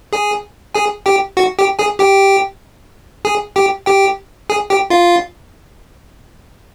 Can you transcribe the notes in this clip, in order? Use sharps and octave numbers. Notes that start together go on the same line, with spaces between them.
G#4 G#5
G#4 G#5
G4 G5
F#4 F#5
G4 G5
G#4 G#5
G4 G5
G#4 G#5
G4 G5
G4 G5
G#4 G#5
G4 G5
F4 F5